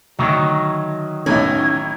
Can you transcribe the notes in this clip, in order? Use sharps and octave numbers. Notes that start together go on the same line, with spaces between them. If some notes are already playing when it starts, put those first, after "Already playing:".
D2 D#3 F#3
B1 E2 A2 C#4 D#4 G#6